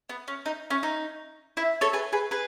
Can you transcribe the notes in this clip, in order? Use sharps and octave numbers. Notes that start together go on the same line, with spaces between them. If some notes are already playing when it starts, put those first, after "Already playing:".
B3
C#4
D#4
C#4
D#4
E4
A4 C#5
G#4 B4
G#4 B4
G#4 B4